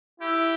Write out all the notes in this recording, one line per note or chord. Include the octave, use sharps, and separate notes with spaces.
E4 G4